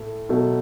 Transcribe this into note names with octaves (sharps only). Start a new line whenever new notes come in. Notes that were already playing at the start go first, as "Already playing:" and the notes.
Already playing: A2 A3
B2 F#3 A3